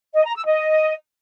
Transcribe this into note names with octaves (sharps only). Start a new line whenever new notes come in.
D#5
A#5
E6
D#5